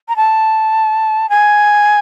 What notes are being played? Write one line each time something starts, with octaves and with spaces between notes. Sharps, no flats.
A#5
A5
G#5